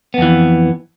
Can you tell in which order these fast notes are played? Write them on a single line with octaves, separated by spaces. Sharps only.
B3 F2 E3